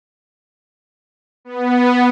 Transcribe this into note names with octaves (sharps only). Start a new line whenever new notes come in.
B3